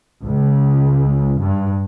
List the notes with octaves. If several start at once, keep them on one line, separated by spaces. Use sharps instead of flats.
C#2
G2